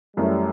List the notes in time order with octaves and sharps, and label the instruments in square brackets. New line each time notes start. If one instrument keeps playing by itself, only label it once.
[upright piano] F#2 E3 A3 C#4 E4 [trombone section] G3